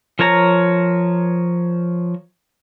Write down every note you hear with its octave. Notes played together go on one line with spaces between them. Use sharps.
F3 A#4 C#5 A#5